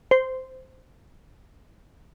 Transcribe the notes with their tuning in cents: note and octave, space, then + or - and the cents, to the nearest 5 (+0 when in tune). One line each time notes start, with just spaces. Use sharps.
C5 -10